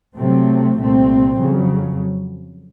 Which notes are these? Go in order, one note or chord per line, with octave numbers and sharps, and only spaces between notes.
C3 F#3 A3 C4
C2 A#2 A3 C4
F2 C#3 F#3